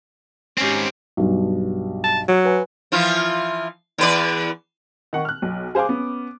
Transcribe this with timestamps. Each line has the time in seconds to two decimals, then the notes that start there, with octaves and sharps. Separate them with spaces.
0.58 G#2 C4 C#4 G4
1.17 B1 G2
2.04 A5
2.28 F#3
2.45 B4 G#5
2.92 E3 F3 F4
3.98 E2 B4 D5
5.13 D#3 F#5 C#6
5.25 F6 F#6
5.42 B1
5.75 G#4 C5 F5 G#5 D6
5.89 B3 C#4